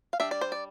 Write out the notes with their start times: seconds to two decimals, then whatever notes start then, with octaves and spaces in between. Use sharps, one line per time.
0.13 F5
0.20 G3 D4 E5
0.31 D5
0.41 C5
0.52 D5